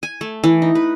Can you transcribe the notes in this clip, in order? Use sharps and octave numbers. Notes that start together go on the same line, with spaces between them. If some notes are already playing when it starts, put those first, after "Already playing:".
G#5
A3
E3
D#4
B4